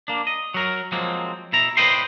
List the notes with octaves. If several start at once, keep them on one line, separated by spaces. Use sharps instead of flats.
A#3 D4
D#5
F#3 A#4
F3 F#3 G#3 A#3 C4
B2 E4 A#5
A2 B4 C5 D#5 G5 C6